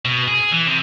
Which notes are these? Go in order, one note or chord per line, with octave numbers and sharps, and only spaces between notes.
B2
G#4
E3
C3